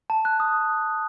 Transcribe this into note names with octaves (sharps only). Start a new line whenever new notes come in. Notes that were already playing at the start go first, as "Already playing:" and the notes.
A5
F#6
D#6